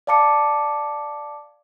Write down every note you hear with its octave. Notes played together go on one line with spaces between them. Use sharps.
D5 F5 A5 D6 C#7